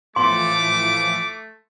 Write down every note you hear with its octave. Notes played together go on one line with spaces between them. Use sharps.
A2 E3 F3 A3 C6 D6